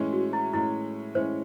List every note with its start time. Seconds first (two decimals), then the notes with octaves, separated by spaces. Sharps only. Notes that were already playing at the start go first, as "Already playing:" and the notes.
Already playing: A2 E3 G#3 C#4
0.13 F#4
0.33 E4
0.53 A2 E3 G#3 C#4 E4
1.15 A2 E3 G#3 C#4 C5